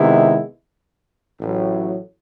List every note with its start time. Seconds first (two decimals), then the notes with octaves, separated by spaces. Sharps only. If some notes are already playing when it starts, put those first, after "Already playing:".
Already playing: C3 D#3 G#3 B3 E4
1.40 A1 A2 F#3